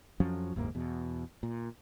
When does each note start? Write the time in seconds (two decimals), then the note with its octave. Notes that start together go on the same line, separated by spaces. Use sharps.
0.20 F2 F3 F#3 C#4
0.56 F#1 D#2 G#2 A#3
0.75 E2 B2
1.43 A#2